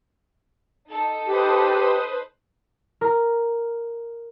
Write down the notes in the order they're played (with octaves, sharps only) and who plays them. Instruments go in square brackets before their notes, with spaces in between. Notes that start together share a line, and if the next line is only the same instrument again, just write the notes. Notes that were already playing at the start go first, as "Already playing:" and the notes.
[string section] D#4 A4
[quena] G4 [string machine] B4 C5 D#6
[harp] A#4